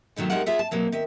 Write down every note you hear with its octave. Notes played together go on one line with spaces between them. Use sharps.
D#2 B2 D#3 F#3 A3
A2 G#3 D#4 G4 A#4 F#5
F4 G#4 E5 F#5
A5
B2 F#3 A#3 C4
D#3 E5